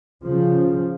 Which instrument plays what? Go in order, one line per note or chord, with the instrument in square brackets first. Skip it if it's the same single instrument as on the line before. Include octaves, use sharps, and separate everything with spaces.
[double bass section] C#3 F3